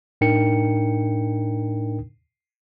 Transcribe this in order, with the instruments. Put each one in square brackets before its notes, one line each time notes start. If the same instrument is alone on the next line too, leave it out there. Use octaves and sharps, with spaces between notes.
[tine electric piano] A2 D4 D#4 A#4 G5 C#7